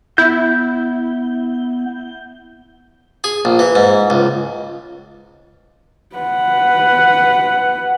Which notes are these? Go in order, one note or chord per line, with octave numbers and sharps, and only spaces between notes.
B3 E4 G6
G#4
A#1
E3
G#2
C#2
B4 F#5